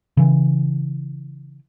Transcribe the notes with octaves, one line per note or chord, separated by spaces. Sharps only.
C#3 E3